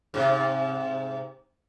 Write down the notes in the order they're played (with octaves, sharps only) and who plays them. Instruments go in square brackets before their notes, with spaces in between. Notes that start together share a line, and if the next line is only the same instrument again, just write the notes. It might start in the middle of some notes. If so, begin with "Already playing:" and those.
[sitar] G#2 C3